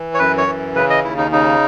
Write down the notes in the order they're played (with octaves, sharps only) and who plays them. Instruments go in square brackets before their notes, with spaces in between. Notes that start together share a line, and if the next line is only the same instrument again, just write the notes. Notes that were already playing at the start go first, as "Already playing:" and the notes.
Already playing: [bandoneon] E3
C#5
F#2 B4
C#5
E3
C#3 B4
D#5
D#2 E4
D#4
C#3 D#4